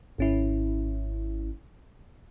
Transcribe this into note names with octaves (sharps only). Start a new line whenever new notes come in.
G#1 C#4 E4